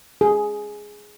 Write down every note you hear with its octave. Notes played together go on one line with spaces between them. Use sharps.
G#4